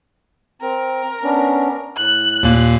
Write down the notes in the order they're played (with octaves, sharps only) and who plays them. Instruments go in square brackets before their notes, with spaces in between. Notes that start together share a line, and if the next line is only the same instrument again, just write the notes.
[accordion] C4 [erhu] A#4
[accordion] B3 C#4 D4
[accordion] A2 [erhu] F#6
[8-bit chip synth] D#2 A#2 A#3